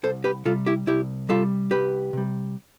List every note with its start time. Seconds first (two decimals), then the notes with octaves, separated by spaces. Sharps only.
0.03 C2 A4 C5
0.24 G4 B4
0.45 C3 G3 F4 A4
0.66 E4 G4
0.87 C2 E4 G4
1.29 C3 G3 F4 A4
1.71 C2 G4 B4
2.13 C3 G3